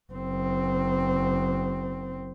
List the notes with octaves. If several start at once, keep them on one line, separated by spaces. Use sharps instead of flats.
F#1 C4